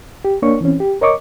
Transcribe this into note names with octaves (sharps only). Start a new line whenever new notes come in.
G4
A#3 D4 A#4 C#5 C#6
E3 C4 C#4
G4
A#4 C#5 D#5 C#6 D6